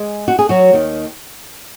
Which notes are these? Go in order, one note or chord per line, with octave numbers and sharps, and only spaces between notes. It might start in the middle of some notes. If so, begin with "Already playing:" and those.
Already playing: G#3 G#4
F#4
G#4
F#3 F#4
D#2 D#3